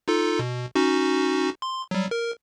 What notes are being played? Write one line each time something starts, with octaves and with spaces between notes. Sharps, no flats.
D#4 F4 A4
B2
C#4 D#4 F#4
C6
F#3 G3
A#4